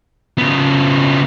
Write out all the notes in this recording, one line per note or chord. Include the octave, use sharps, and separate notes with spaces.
C#3 B3